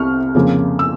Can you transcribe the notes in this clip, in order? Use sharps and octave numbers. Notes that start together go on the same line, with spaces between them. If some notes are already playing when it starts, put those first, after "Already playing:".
Already playing: C2 C3 C#6 F6
F2 C#3 F3 A#3
E6